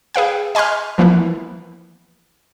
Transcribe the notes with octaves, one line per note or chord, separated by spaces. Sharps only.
G#4 B4 F5 G5
D#5 G#5 B5 C6 F6
E3 F3 A#3 B3 E4